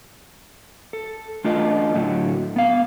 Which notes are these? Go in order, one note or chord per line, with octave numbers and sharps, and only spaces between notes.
A4
A3 D4 F4 A#4 D#5
A2 D3 F#3
B3 F5